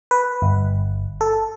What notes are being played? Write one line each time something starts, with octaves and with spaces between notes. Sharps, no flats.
B4
G1
A4